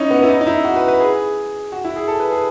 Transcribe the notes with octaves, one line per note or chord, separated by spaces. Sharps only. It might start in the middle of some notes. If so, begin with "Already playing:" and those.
Already playing: C#4 D#4 E4
B3
E4
D#4
D#4
E4
F#4
B4
B4
G#4
F#4
E4
G#4
A4
B4
G#4